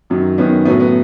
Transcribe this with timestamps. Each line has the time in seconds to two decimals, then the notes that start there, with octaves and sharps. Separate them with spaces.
0.10 F#2 D#3 F#3
0.38 F#2 D#3 F#3 B3 C#4
0.65 A2 F#3 B3 C#4
0.80 B3